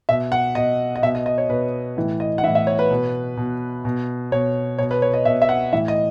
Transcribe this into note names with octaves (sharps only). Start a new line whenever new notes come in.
B2 E5
F#5
B2 D#5
D#5
B2 E5
D#5
D#5
C#5
B2 B4
A2 E3
D#5
F#5
A2 E3 E5
E5
C#5
B4
B2
B2
B2
B2 C#5
B2 C#5
B4
C#5
D#5
B2 E5
E5
F#5
A2 E3 E5
D#5